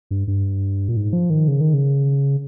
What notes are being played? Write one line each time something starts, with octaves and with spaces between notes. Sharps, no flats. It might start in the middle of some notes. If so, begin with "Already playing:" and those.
G2
G2
A#2
G#2
F3
D#3
C#3
D#3
C#3